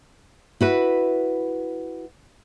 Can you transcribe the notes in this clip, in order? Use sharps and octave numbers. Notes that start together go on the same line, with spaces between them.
E4 F#4 B4